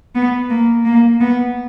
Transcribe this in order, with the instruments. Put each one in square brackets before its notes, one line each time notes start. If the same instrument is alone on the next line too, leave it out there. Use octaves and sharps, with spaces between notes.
[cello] B3
A#3
A#3
B3